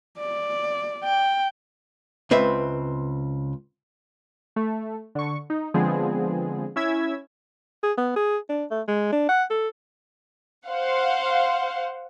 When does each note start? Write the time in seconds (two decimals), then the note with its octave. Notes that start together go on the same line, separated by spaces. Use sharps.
0.19 D5
1.04 G5
2.31 C#2 C4 B4 E5
4.56 A3
5.15 D3 C#6
5.50 D#4
5.74 D3 F3 G#3 B3 C4 G#4
6.76 C#4 E4 E6 G#6 B6
7.83 G#4
7.98 B3
8.16 G#4
8.49 D4
8.71 A3
8.88 G#3
9.12 D4
9.29 F#5
9.50 A4
10.66 C5 F5 F#5